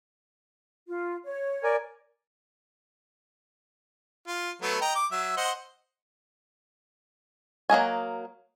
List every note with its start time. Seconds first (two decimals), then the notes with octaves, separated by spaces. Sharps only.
0.87 F4
1.25 C#5
1.63 A#4 D5 G#5
4.27 F4
4.62 F#3 A3 B3
4.81 D#5 G5 A#5
4.95 D6
5.12 F#3 E5
5.37 C5 D#5 F#5
7.70 F#3 A#3 D#5 G#5